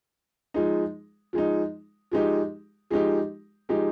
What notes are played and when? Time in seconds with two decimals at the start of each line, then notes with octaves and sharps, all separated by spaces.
0.54 F3 G#3 D#4
1.33 F3 G#3 D#4
2.12 F3 G#3 D#4 G4
2.91 F3 G#3 D#4 G4
3.69 F3 G#3 D#4 G4